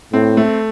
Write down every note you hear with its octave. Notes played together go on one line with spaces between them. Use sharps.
A2 C4
A3